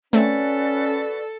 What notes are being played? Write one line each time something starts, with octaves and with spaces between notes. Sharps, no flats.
A3 C4 C#4 F#4 A4 B4 D5